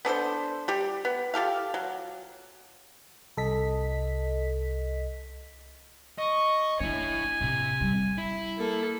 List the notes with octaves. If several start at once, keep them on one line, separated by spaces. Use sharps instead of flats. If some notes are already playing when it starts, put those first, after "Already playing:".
B3 D4 A4 C5
G3 G4
B3
F4 G4 A4 F5
F#3
C2 A4 D#5 B6
D#5 C#6
F3 D4 E4 C#5 G#5
A2 C3
G3
E4
A#3 A4